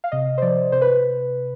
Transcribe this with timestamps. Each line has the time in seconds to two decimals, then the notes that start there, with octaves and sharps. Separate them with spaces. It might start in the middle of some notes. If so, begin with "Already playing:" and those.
0.04 F5
0.12 C3 D#5
0.38 C5
0.42 F3 D5
0.72 C3 C5
0.82 B4